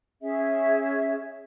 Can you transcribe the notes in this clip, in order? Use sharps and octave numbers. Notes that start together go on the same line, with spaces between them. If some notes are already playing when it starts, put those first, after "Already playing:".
C#4 G#4 E5